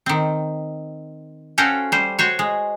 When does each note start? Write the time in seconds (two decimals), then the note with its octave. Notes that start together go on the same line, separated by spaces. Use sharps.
0.06 D#3 C4
1.58 C#4 F#4 A4 C5 F5 G5
1.92 G3 C5
2.19 F#4 C5 C#5
2.39 G#3